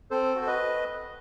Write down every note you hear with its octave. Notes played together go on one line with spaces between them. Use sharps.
C4 A4 C5
F#4
C5
B4 D#5